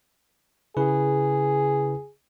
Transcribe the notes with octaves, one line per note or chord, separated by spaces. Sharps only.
C#3 E4 G#4 B4